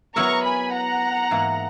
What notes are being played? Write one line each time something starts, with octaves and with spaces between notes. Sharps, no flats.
F#3 B3 E4 A#4 E5 A#5 C#6
G#5 B5
F#5 A#5
G#2 E3 A#3